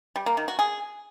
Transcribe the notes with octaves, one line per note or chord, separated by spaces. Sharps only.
G3
A#3
D#3
F#4
G#4